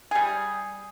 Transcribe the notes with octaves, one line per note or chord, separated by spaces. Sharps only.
G3 G#4